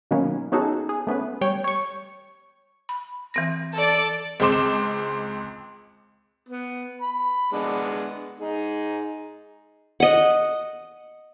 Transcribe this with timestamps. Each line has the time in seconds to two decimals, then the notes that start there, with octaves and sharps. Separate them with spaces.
0.11 B2 D#3 F#3 A#3 B3 C#4
0.52 B3 C#4 D#4 F#4 G#4 A4
0.89 G#4
1.07 A3 B3 C#4 B4
1.41 G3 C#5 G5
1.64 C#5 C#6
2.89 B5
3.34 E3 C4 A#6
3.73 A4 D5
4.40 C#2 G#3 C4 C6 D6 E7
6.48 B3
7.02 B5
7.52 G#3 B3 D4
8.40 D#4 G#4
10.00 D#5 F#5